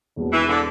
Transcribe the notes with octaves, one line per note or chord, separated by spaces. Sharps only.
E1 E2 B2
E3
D3